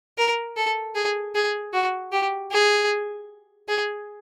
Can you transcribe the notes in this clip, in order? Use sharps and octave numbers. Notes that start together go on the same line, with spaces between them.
A#4
A4
G#4
G#4
F#4
G4
G#4
G#4